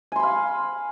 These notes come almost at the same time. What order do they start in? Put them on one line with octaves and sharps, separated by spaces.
G#5 C6 B5 F5